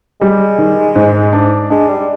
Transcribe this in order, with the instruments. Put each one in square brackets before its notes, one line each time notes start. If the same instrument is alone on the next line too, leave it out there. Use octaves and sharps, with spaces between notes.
[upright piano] G3 [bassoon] G#3
[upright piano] D#3
G#2
D4
[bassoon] G#3 [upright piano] D4
[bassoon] G3